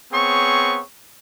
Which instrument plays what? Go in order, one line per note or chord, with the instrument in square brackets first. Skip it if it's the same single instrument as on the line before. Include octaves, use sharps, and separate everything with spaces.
[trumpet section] B3 C4 G#4 C#5 C#6